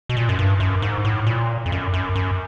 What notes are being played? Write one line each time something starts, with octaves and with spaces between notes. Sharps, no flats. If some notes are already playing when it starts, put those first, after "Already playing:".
B2
A#2
F#2
G2
F#2
G#2
A2
A#2
F2
F#2
F#2
F#2